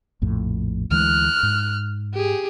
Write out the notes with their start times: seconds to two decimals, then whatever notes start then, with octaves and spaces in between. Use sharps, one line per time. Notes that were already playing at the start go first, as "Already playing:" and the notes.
0.22 A#1 F2 A2
0.91 D2 E3 G#3 F6 F#6
1.43 G#2
2.14 G4 G#4